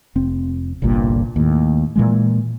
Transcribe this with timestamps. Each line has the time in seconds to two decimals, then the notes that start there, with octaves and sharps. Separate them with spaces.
0.15 F1 C4
0.82 G1 C2 G2 A#2
1.36 D#2 A2
1.96 A#2 E3 G#3